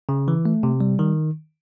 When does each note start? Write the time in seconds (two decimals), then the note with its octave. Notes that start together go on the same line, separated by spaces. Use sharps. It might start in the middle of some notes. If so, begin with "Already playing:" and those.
0.09 C#3
0.28 E3
0.45 A3
0.63 C3
0.81 G3
0.99 D#3